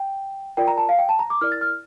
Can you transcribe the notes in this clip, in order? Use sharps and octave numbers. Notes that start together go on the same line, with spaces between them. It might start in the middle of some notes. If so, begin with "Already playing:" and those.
Already playing: G5
F4 A#4 D5 G5
A#5
A5
F5
G5
A5
A#5
D6
E4 A#4 D5 F6
A6
F6